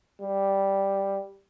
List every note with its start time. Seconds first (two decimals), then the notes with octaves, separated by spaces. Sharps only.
0.21 G3